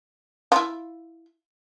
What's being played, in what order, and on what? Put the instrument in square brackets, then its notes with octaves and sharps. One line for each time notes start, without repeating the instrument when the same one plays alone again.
[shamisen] E4 F4